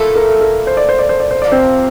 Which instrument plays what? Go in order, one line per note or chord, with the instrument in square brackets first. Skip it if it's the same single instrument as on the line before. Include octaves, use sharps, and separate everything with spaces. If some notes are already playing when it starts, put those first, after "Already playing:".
Already playing: [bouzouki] A#2 A3 E4 A4
[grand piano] A#4
A#4
C5
D5
C5
D5
C5
D5
C5
[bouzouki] C3 F3 A#3 [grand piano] D5
[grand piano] C4 C5